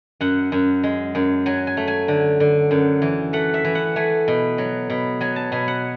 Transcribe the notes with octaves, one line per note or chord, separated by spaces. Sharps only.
F#2 F#5
F#2
G#3
F#2
F#3 G#5
G#5
A3
G#5
D3
D3
F#2
E3
A3 F#5
E5
E3
F#5
A3 G#5
B2
F#3
B2
F#3 G#5
A5
B2 G#5
F#5